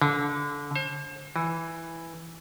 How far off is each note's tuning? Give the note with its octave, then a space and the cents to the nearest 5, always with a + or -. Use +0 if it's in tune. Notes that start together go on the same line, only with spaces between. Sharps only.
D3 -25
C5 +40
E3 +0